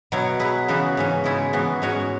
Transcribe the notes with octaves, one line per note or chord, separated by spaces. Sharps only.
B2 F#3 E4 C#5
F#3 E4 G#4 B4
C#3 E3 B3 F#4 B4
G#2 E3 C#4
C#3 G#3 E4 G#4 C#5
G#2 E3 B3 F#4
G#2 G#3 C#4 F#4 C#5